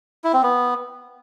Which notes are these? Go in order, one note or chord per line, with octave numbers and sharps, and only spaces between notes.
E4
C4
B3